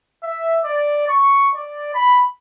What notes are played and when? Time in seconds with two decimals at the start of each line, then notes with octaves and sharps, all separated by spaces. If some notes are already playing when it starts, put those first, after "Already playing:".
0.24 E5
0.64 D5
1.08 C#6
1.55 D5
1.93 B5